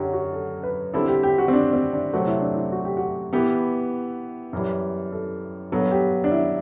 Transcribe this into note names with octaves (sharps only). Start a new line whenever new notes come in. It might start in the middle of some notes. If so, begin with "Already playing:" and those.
Already playing: F#2 D3 F#3 G4
F#4
A4
B4
D3 G3 C4 E4 A4
G4
G4
F#4
C4
D4
C4
D4
C3 F#3 A3 C4 F#4
E4
D4
E4
F#4
G4
F#4
E3 B3 E4 G4
F#2 E3 G3
A4
G2 F#3 B3 A4
G4
D4
E4